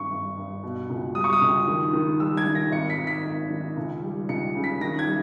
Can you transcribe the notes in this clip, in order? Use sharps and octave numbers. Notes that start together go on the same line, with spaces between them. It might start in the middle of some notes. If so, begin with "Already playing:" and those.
Already playing: G#1 G2 C#6
G2
G2
B2
C#2
G3 D#6
C#6
D#6
C#2
D#3
D#3
G3 E6
G#6
D#3
A#6
G#1 C#7
B6
G#1
B6
G#1
D#3
C#2
G3
C#2 C#7
C#3
B6
D#3 A#6
G#6
G3